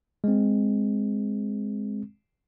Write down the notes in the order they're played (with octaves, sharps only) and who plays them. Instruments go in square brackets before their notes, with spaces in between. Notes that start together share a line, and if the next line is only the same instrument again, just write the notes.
[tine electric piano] G#3 C4